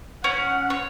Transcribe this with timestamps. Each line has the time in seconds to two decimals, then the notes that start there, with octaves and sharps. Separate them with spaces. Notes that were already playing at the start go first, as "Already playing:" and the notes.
0.24 C#4 F#5
0.70 C#5